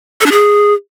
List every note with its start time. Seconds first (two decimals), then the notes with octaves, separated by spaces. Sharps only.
0.21 A4
0.26 D4
0.31 G#4